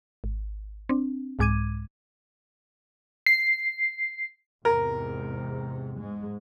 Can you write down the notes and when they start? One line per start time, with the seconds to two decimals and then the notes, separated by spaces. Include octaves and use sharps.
0.24 G#1
0.89 C4 D4
1.39 C2 G#2 G#3 D6 G#6 D#7
3.26 C7
4.65 E2 G#2 C3 A#4
5.96 G#2 G#3